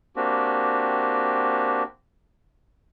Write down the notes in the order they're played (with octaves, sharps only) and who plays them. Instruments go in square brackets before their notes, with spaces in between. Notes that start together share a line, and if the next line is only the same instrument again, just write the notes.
[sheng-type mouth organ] A#3 C4 D4 F#4 G4